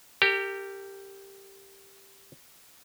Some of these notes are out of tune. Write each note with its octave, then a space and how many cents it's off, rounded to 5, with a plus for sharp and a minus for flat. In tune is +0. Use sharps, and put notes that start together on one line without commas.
G4 +0 A#4 -40